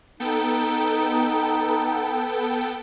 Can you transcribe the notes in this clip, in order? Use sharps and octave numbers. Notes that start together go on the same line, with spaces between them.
B3 D#4 A4 G5